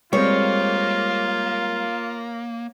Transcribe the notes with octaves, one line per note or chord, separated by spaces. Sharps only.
G3 G#3 A#3 C4 F4 C#5